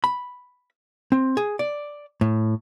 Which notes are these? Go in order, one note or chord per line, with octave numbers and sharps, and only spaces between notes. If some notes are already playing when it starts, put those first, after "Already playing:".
B5
C4
G#4
D5
A2